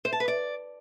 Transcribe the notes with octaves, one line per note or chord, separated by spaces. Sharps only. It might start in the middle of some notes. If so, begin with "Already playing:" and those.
C5
A5
B4
D5